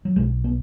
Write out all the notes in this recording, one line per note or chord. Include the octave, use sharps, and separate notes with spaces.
F#3
B1 B2 G#3
B3